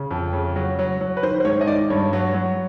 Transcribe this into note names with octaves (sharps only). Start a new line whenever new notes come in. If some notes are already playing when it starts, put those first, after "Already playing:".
Already playing: C#3
F2
C#3
F#3
F#3
F#3
B4
D#3 C5
C5
G#2 C#5
D#5
D#3 D5
G2 C#5
F#3
F#3